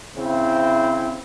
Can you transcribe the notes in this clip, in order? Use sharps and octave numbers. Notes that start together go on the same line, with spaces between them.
C#3 C4 E4